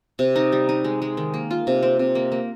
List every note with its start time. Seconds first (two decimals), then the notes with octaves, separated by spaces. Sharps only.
0.19 C3
0.36 D#4
0.52 G3
0.69 D#4
0.84 G#3
1.02 G#3
1.17 D#3
1.34 A#3
1.51 F4
1.67 C3
1.83 C4
1.99 C3
2.15 A#3
2.32 A#3